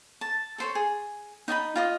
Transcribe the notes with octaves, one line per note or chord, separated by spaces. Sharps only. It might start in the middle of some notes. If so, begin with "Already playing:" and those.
A5
A4 C5 C#5
G#4
D#4 D#5 G#5 B5
F4 D#5 D#6